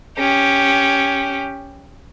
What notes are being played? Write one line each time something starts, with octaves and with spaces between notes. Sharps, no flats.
C#4 G4